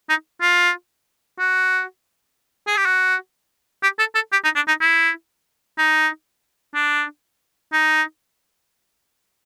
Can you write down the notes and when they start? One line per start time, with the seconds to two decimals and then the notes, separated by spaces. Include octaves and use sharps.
0.09 D#4
0.41 F4
1.39 F#4
2.67 G#4
2.77 G4
2.86 F#4
3.83 G4
3.99 A4
4.15 A4
4.32 G4
4.44 D#4
4.56 D4
4.68 D#4
4.81 E4
5.78 D#4
6.75 D4
7.73 D#4